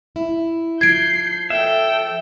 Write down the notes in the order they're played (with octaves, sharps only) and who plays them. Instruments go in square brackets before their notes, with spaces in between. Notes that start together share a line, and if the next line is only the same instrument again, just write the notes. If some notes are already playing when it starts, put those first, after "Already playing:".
[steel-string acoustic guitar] E4
[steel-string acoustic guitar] F3 [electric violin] G6 C7 [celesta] G#6 D7
[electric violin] A4 G5 [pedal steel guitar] E5